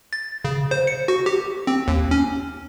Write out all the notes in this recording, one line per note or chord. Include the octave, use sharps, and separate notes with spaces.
A6
C#3
C5
C#7
F#4
G4
C4
D#2
C#4